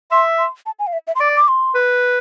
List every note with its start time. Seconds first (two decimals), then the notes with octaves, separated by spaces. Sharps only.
0.11 E5 C6
0.38 C6
0.66 A5
0.79 G#5
0.87 F5
0.93 E5
1.07 E5
1.15 C6
1.20 D5 D6
1.36 D6
1.48 C6
1.75 B4